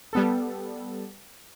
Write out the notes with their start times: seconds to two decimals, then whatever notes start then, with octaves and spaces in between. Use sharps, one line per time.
0.13 G3 B3 A4